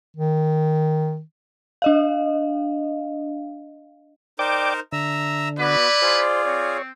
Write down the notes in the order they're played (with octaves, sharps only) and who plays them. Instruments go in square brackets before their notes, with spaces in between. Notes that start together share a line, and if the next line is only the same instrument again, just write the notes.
[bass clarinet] D#3
[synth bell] D4 D#5 F5
[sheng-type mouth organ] D#4 A#4 C5 [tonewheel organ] D5 G5 D6
[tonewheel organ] D3 [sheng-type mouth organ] E5 A#5 E6
[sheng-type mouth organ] B3 F#4 [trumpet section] E4 B4 [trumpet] D5
[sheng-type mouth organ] F4 G#4 [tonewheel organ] C5
[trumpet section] C4 [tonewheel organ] C#5